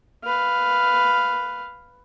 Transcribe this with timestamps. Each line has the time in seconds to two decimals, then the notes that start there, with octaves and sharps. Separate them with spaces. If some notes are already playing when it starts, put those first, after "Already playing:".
0.25 B4 F5